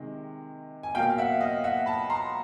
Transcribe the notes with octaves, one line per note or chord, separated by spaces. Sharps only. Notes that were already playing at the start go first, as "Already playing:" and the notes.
Already playing: C3 D#3 G#3
G#5
B2 F#3 A#3 F5 G5
F5
E5 F#5
D#5 F5
E5 F#5
A5 B5
A#5 C6